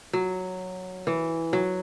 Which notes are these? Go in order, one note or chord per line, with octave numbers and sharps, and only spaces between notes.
F#3
E3
F#3